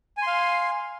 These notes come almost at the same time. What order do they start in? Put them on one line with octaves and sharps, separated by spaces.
G#5 C6 F5